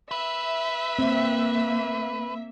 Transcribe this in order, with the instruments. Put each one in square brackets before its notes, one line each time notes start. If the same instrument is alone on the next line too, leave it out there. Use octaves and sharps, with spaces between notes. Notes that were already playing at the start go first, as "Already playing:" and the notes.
[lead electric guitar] B4 [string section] E5
[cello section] A#3 [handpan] C4